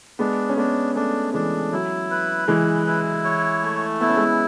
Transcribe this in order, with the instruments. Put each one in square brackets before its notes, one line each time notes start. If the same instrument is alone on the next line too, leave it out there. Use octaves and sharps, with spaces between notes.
[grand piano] G#3 B3 [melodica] D4
[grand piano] C#4
[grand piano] G#3 B3 [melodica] D4
[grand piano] A3 C#4 [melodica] D4
[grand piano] E3 G#3 [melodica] D4
[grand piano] F#3 [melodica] E4
[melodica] B4
[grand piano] E3 G#3 [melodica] E4
[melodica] E4
C#5
A3
[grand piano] B3 [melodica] E4
[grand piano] C#4
G#3 B3